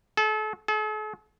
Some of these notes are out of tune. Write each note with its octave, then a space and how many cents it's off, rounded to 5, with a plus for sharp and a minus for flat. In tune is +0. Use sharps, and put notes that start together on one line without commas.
A4 -35
A4 -45